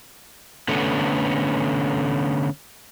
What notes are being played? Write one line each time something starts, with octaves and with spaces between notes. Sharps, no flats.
D3 A3 B3 C#4